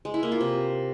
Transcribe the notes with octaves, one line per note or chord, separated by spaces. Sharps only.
G#3
E4
A#3
F4
C3